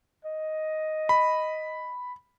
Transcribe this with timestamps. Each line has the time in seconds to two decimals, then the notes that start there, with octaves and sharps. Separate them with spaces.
0.25 D#5
1.09 B5